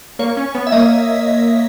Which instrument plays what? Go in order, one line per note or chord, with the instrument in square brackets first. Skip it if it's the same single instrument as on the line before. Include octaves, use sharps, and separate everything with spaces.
[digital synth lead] A#3 [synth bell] C#5
[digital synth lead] C#4
B3
[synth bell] E5
[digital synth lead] A#3 [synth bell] D#5